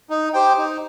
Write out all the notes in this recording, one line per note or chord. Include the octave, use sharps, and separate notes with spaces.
D#4
G4 C5 G5
D#4